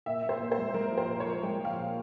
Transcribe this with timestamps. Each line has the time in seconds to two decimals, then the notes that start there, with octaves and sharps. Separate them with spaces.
0.06 A#2 E5
0.23 A#2
0.29 C5
0.40 A#2
0.52 C5
0.58 G#3
0.74 G#3 A#4
0.92 F3
0.98 C5
1.08 A#2
1.20 C#5
1.26 F3
1.43 G#3 G5
1.60 F3 F5
1.77 A#2